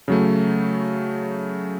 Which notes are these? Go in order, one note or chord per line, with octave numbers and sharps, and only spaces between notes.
C#3 F#3 A3